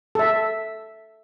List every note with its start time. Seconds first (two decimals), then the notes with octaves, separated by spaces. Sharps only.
0.15 A4 E5